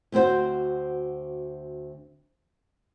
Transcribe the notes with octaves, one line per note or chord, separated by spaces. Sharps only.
D2 C4 F#4 C5